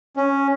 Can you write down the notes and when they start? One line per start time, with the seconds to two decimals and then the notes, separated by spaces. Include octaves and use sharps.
0.17 C#4